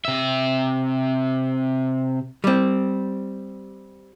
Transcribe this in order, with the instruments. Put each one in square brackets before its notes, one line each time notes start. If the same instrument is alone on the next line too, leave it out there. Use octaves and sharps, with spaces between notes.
[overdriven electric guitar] C3 E5
[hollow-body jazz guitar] G3 C4